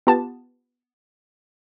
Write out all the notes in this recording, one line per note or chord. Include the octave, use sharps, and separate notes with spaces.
B3 F4 G4 A5